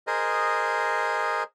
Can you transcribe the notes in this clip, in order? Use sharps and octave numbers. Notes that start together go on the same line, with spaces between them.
G#4 A#4 C5 D#5